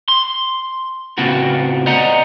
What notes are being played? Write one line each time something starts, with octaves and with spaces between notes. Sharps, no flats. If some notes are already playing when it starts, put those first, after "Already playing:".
C6
A2 C#3 B3 C4 F4 F#4
C5 D5 D#5 F#5 A#5